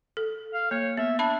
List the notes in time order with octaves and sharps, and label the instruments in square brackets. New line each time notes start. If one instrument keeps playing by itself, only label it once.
[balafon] A4
[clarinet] F5
[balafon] A#3 [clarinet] C#5
[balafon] B3 [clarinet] E5
[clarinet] D4 [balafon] E5 A5 B5